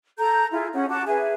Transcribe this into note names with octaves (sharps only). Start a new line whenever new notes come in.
A4 A#5 G6
E4 F4 G#4
C#4 G#4 F#5
F#4 F#5 A5 D6
G#4 B4 E5 G#5